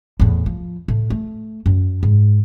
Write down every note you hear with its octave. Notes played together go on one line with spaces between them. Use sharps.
E2 A2
F3
A2
A3
F#2
G#2